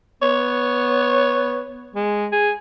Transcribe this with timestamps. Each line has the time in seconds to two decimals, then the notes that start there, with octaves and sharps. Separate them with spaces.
0.22 B3 C#5
1.95 G#3
2.32 G#4